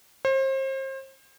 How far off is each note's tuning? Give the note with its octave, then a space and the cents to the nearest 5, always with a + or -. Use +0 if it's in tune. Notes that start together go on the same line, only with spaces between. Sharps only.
C5 +35